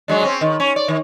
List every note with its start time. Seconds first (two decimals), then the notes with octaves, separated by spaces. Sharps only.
0.08 F#3 G#3 D4
0.23 C4 C#4
0.41 D#3
0.60 C#4
0.76 D5
0.88 D#3